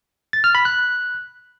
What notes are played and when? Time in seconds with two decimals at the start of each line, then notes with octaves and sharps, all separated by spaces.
0.33 A6
0.44 F6
0.55 B5
0.65 F#6